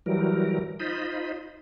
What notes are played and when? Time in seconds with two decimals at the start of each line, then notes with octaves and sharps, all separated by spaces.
0.06 E3 F#3 G3 A#4
0.80 D#4 F4 C5 D#5 B5